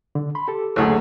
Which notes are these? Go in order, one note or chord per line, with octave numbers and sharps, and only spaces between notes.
D3
B5 C6
G4 A4
F#1 D2 G#4 A4 C#5